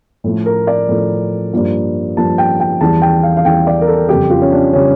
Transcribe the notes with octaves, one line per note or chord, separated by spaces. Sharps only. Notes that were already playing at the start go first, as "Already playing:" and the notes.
A2 F3 A3
A#4
D5
A2 F3 A3
G2 F3 A#3
G2 F3 A#3 A5
G5
G5
E2 E3 G3 A5
G5
F5
F5
E2 E3 G3 G5
D5
A#4
A4
F2 C#3 G3 G4
F4
C#4
D4
C#3 G3 C#4